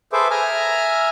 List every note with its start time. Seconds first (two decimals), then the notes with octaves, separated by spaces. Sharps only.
0.13 G#4 A4 B4 C5 E5 D6
0.30 E5 G#5 A#5 F6